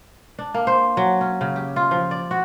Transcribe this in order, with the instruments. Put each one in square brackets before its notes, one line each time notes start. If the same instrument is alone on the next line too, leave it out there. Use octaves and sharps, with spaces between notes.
[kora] D4
A#3
C5
F#3
C#4
C#3
G4
F4
F3
D5
F#4